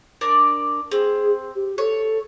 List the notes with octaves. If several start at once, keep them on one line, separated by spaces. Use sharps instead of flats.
D4 A#4 D5
C4 G#4
G4
A4 C#5